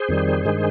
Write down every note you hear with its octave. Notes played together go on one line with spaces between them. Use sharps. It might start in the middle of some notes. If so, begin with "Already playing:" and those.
Already playing: G#4 C5
F2 D#3 G3
G2 D#3 G#3